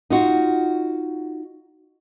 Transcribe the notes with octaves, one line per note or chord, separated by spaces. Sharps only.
D#4 F4 F#4